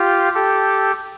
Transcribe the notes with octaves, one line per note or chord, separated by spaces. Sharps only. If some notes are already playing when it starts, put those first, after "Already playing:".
Already playing: F4 G4
G4 A4